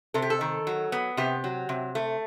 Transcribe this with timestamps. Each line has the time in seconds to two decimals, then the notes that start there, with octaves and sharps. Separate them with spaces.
0.14 C3 A4
0.22 G4
0.30 A4
0.41 D#3
0.67 F#3
0.92 B3
1.17 C3 G4
1.44 F#3
1.69 C3
1.95 A3